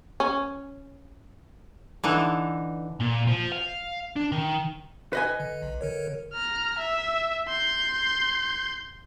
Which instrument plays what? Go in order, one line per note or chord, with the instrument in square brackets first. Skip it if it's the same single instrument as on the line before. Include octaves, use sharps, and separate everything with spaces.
[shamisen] C#4
[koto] D3 E3 D#4
[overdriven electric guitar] A#2
F3
F5
D4
D#3
[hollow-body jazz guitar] B4 D#5 G#5
[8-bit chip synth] D3
B1
D3 A#4 C#5
[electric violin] A#5 F6
E5
C6 G6